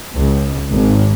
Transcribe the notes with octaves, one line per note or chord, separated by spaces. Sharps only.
C#2
G#1